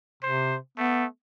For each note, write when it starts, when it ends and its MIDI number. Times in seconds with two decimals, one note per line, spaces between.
0.23 0.57 48
0.23 0.56 72
0.78 1.05 57
0.78 1.05 59